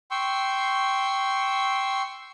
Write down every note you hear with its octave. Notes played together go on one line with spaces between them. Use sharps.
G5 C6 C#6 E6